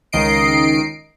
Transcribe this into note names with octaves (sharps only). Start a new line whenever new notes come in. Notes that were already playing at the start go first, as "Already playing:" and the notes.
C#2 D#3 D#5 C7 D7